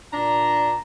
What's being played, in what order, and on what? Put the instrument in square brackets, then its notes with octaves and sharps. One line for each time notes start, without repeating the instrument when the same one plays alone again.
[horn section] A#2 D4 A#5